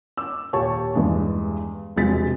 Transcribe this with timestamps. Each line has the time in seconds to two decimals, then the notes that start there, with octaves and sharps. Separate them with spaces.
0.17 D6 E6
0.53 D#2 A#2 G4 C#5 A5 C#6
0.95 E2 G2 G#3
1.96 E1 C3 F3 G#3 A6 B6